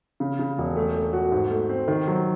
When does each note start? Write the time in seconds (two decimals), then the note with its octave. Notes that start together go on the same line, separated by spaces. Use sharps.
0.20 C#3
0.39 C#3
0.58 E1
0.76 A3
0.95 A3
1.13 F#4
1.32 G#2
1.51 A3
1.69 C4
1.88 D#3
2.08 F#3